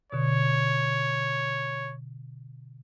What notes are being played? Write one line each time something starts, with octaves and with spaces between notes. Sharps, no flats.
B2 D3 C#5